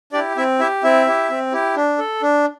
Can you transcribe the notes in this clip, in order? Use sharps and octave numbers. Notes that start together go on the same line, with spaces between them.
D4 E4 G4 D5
C4 E4 E5
E4 G4 E5
C4 E4 E5
E4 G4
C4
E4 G4
D4
A4
D4